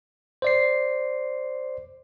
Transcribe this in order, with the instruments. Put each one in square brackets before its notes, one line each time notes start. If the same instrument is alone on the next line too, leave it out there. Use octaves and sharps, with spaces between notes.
[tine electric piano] C5 D5 C7